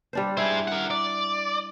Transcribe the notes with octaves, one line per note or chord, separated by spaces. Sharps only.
G3 D4 C5
E4 G#4 C5
A#4 F#5
D5